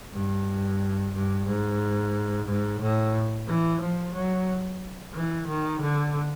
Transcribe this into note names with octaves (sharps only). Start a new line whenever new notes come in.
G2
G2
G#2
G#2
A2
E3
F3
F#3
E3
D#3
D3